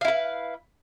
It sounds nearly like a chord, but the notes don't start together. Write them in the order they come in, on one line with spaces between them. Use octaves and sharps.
F5 E4 B4